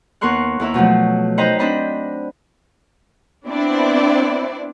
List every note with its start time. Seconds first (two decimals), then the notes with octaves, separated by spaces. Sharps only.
0.21 D#2 B3 A#4 C6 C#6 F#6
0.60 D#2 E4 A#4 E5
0.74 B2 F3 F#3 A3
1.38 D#4 B4 C5 D#5 G5 A#5
1.59 C4 D4 D#5 B5
3.46 B3 C4 D4 E4 D5